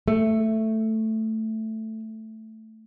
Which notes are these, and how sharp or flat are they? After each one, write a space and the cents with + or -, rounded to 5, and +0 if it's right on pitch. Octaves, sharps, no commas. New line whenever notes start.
A3 +5